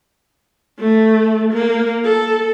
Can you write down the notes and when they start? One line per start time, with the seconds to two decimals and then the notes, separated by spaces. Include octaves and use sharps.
0.79 A3
1.53 A#3
2.04 A4